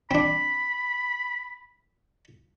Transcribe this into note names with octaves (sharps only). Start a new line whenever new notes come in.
C4 D4 B5